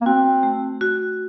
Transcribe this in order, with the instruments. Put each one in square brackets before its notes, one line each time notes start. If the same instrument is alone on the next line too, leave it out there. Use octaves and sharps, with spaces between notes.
[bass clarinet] A#3
[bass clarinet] C4 [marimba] F#4
[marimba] A3
F#4